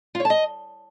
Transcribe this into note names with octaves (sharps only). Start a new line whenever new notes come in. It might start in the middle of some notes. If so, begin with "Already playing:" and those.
F4
C#5
A5
D#5